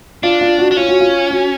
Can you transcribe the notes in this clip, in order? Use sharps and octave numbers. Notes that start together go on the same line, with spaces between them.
D4 F4
F4
F#4
D4
C#4 F4
F#4
F4
F#4